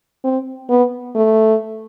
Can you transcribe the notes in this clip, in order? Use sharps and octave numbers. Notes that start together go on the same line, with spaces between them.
C4
B3
A3